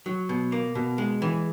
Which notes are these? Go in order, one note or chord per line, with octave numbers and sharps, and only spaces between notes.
F#3
B2
A#3
B2
G#3
E3